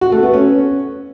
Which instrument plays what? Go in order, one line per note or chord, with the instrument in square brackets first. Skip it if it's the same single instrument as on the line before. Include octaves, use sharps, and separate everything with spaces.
[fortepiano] F#4
A3
B3
C#4